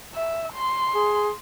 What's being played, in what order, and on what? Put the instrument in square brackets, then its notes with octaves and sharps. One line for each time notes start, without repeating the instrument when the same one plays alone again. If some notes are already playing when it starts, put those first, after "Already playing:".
[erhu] E5
C6
[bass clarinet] G#4